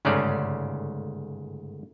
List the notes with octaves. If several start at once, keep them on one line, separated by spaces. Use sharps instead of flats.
G1 G#2 C#3 A3 C#4 D5